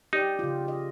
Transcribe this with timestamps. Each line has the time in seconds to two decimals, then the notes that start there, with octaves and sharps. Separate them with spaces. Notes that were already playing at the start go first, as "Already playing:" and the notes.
0.13 D#4 G4 D5
0.39 C#3 F4
0.68 D#5